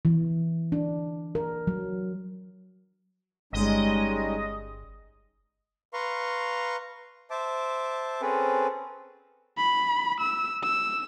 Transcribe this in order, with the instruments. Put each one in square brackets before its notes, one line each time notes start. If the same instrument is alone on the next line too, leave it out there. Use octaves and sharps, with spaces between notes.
[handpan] E3
D4
A#4
F#3
[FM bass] G1 [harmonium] G3 C#4 D#4 [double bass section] G#3 [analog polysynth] D#5
[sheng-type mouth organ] B4 F5 A#5 C6 C#6
C5 E5 A5 D6
C4 C#4 G#4 A4 B4
[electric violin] B5
E6
E6